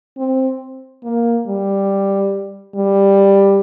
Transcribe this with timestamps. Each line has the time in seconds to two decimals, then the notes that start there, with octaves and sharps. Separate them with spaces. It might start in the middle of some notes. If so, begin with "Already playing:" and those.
0.18 C4
1.04 A#3
1.47 G3
2.75 G3